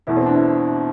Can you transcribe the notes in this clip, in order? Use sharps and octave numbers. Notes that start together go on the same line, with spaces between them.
E2 B2 E4
C4
D4
E4